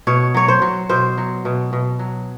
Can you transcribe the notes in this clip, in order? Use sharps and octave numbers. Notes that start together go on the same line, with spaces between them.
B2 C#5
F#3 C#5
C5
F#3
B2 C5
F#3
B2
B2
F#3